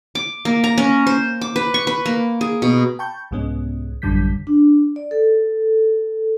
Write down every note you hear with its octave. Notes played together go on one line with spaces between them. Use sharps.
D6
A#3
A#5
C#4
C5
D6
B4
C#6
B4
A#3
G#4
B2
G5 A5 B5 C#6 G6
C2 G#2 G#3 B3 C#4
A1 F#2 D3 G3 G6 B6
D4
D5
A4